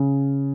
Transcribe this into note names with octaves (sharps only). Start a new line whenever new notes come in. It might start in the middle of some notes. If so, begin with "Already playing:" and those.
Already playing: C#3